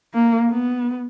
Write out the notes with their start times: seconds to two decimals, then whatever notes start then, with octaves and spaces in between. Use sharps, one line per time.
0.14 A#3
0.50 B3